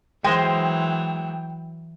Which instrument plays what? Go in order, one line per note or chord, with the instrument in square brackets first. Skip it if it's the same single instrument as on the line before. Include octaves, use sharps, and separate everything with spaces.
[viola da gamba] E3 F#3 [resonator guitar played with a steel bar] G#3 C5 [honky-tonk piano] G5